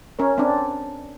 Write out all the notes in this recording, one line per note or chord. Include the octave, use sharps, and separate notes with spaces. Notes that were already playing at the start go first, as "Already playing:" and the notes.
C#4 A#4 C#5
C4 D4